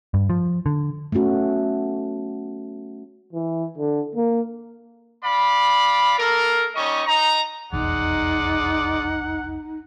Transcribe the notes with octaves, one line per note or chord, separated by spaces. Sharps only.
G2
F3
D3
A3 B3 C#4 F#4
E3
D3
A#3
D5 F5 B5
A#3 A4 A#4
G3 C#4 D#4 D#5 C#6
D#4 A#5
F1 B1 E2 G#3 D#4 D5 F#5